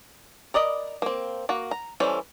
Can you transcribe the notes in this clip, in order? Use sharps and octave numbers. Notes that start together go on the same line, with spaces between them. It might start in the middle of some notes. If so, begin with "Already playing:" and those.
A#4 D5 D#5 B5
A#3 C4
A#3 F#4
A#5
E3 G3 C#4 A4 C5